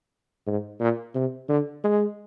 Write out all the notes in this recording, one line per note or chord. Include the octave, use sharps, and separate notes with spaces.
G#2
A#2
C3
D3
G#3